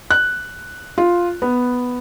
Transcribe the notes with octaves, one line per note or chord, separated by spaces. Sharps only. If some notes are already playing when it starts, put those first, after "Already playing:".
F#6
F4
B3